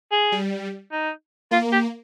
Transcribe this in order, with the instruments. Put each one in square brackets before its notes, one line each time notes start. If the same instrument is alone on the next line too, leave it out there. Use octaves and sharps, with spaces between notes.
[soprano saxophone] G#4
[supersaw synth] G3
[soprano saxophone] D#4
[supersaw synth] A#3 [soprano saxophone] F4
[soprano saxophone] G4